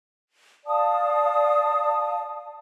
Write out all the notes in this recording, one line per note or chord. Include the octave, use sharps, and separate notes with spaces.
D5 F5 A5 D#6